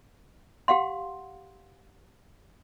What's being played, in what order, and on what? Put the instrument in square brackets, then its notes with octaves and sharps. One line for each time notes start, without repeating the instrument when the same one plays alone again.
[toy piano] G4 F5 F#5 C6